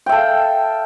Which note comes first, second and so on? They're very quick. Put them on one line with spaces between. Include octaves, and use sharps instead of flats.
G5 E5 A4 F5